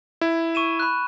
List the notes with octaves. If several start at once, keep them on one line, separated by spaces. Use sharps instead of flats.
E4
C#6 D#7 E7
B5 F#6